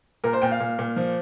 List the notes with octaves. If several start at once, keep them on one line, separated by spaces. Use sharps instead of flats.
A#2 A#4
C5
A#2 G5
F5
A#2
A#2
F3